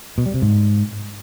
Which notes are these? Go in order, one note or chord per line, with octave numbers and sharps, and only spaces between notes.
B2
G3
C3
G#2